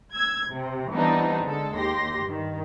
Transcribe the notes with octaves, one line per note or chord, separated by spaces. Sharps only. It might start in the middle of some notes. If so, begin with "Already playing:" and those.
E6 G#6
C3
E3 G3 B3 C4 D4 D#4
D3 G#3 A4
D#2 G4 C6 A#6
G2 D#3